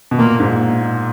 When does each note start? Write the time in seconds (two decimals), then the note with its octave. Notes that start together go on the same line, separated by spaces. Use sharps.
0.11 B2
0.18 A#2 A#3
0.40 G#2